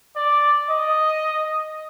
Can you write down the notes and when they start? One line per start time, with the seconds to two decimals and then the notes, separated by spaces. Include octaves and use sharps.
0.16 D5
0.70 D#5